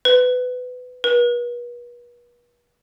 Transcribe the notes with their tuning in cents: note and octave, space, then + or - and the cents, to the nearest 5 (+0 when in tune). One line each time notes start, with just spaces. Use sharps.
B4 +20
B4 -40